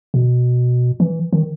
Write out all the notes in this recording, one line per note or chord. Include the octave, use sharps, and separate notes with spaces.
B2
E3
D#3